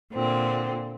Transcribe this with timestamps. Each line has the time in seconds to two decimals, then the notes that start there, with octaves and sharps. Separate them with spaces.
0.12 A#2 D3 C4